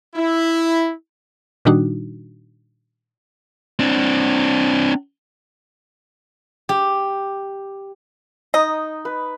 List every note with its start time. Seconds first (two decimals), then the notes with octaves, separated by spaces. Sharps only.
0.15 E4
1.65 A#2 D#3 G3 D4 D#4 F#4
3.79 C4 D4
6.69 G4
8.54 D#4 D#5
9.05 B4